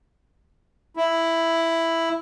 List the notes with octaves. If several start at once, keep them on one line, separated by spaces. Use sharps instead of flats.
E4